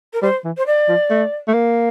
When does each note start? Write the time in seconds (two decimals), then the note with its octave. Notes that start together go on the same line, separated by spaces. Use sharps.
0.13 A#4
0.22 G3 C5
0.44 E3
0.57 C5
0.66 D5
0.88 F3
1.10 A3
1.47 A3
1.54 A#3